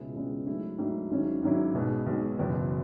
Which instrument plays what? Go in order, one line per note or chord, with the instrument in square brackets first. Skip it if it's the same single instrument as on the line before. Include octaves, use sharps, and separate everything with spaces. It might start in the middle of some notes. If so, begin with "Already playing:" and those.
Already playing: [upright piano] C#2 B2 G#3 C#4 E4
C#2 B2 G#3 C#4 E4
G#2 F#3 A3 E4
G#2 F#3 A3 E4
G#1 G#2 F#3 C#4 E4
G#1 G#2 F#3 C#4 E4
B1 B2 G#3
B1 B2 G#3
F#1 E2 B2 F#3